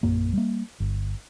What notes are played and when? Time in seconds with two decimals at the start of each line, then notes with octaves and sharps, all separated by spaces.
0.03 A#1 F#2 A#3
0.33 G3 A#3
0.80 G1